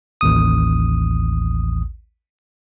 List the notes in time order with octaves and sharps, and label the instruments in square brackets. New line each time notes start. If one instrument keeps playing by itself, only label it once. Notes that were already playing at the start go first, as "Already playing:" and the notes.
[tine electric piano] A1 D#2 D#6